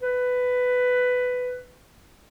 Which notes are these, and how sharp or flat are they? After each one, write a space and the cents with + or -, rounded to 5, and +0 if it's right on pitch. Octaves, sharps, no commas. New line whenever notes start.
B4 +10